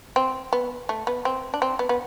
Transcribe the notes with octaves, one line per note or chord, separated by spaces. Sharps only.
C4
B3
A3
B3
C4
D4
C4
B3
B3